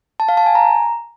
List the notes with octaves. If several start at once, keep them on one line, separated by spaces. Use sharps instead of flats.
A5
F5
A5
G#5
A#5